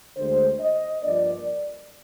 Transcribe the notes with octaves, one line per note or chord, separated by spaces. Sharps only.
D2 D3 G#3 D4 C5
D#5
G2 F3 A#3 D4 D5